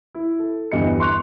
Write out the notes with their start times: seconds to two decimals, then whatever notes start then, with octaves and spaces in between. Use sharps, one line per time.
0.15 E4
0.39 A4
0.72 G1 E2 G2 D#5 C#7
1.00 C6 C#6 F#6 F7